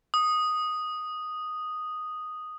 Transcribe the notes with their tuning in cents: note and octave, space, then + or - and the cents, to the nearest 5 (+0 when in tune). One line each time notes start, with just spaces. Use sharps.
D#6 -5